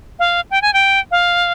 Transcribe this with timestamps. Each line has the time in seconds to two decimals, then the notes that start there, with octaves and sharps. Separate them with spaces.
0.19 F5
0.51 G5
0.62 G#5
0.73 G5
1.11 F5